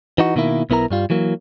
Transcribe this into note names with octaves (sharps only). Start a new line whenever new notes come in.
E3 D#4 F#4
B2 D#3 A#3 E4
B1 B3 E4 A#4 A#5
G2 G3 F4
E3 F#3 A#3